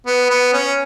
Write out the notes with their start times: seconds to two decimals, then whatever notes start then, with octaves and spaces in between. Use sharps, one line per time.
0.06 B3
0.30 B3
0.53 C#4